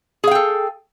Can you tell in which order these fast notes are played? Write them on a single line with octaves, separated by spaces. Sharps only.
G#4 F5 G5 A4